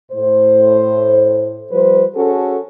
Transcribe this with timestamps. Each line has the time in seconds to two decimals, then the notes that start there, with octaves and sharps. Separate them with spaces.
0.12 A2 C5
1.71 F3 G3 B4 C5
2.15 C#4 F#4 G#4 A4